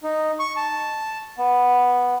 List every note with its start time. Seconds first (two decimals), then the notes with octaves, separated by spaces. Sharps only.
0.03 D#4
0.39 C#6
0.57 A5
1.38 B3